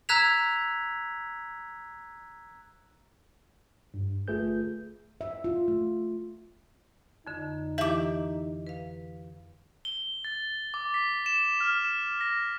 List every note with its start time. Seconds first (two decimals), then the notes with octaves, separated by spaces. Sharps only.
0.09 A#5 E6 F#6 G#6 B6 F7
3.94 G2
4.28 G1 A3 F4 G#4 B4 G6
5.21 E5
5.44 F4
5.68 A3
7.27 F2 D3 D#4
7.78 E3 E4 G4 E5 D6
8.67 B4 F5
9.85 G7
10.25 A6
10.74 D6
10.94 B6
11.26 E7
11.60 F6
11.85 E7
12.21 A#6